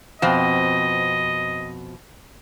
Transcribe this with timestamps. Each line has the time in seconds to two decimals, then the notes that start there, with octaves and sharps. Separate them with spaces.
0.22 F2 B2 C4 D#5